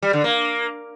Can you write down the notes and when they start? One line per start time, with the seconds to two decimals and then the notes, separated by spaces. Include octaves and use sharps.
0.02 G3
0.13 D3
0.24 A#3